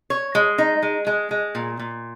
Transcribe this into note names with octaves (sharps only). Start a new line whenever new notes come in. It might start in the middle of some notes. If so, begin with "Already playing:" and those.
C#5
G#3
D#4
G#3
G#3
G#3
A#2
A#2